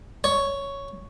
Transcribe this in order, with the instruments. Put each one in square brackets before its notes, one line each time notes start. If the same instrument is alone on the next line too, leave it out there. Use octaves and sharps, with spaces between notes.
[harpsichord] C#5